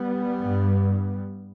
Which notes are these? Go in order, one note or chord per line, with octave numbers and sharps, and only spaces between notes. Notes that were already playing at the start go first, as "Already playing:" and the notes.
Already playing: G3 B3
G2